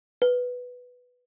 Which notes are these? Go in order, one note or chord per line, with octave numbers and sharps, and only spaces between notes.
B4